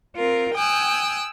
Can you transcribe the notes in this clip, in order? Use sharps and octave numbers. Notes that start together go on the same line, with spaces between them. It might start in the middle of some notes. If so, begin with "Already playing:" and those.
C4 F4 A#4
G5 G#5 D#6 E6 F#6